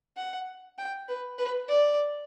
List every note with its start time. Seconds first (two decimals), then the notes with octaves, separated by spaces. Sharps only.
0.17 F#5
0.78 G5
1.08 B4
1.38 B4
1.69 D5